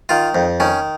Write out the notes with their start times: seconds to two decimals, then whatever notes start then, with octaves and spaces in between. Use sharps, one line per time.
0.09 D#3 F4
0.35 F2
0.60 D#3 C#4